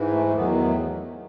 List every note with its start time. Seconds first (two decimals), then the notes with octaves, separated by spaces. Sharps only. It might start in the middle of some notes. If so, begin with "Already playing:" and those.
Already playing: G#2 E3
0.12 A3
0.27 A3
0.33 E2 D#3 F#3 B3
0.55 B3
0.65 A3